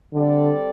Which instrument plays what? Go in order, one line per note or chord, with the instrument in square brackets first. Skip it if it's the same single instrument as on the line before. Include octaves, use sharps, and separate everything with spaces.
[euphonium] D3 [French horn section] G3 C4 A4 D5